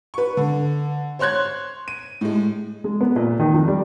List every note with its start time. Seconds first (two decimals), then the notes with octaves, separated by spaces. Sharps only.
0.14 B4 C#6
0.37 D3
1.19 C5 C#5 C6 F#6 G#6
1.88 D#7
2.21 A2 G#3
2.84 G#3
3.01 B3
3.16 A#2
3.39 D#3
3.54 F2
3.68 G3